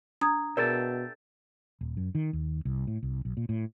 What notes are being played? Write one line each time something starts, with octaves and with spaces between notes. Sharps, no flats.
D4 A#5 D#6 G#6
B2 G#4 A#4 D5 E5 G5 A5
D#1
F#2
D#3
D#2
C2
A2
C2
B1
A#2
A2